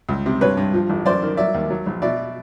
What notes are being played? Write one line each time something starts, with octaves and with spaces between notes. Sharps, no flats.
C#2
C3
G2 B4 C#5
G2
F3
A1
F#2 C5 D5
D#3
F#3 D5 E5
D#2
F#3
A#1
B2 D5 E5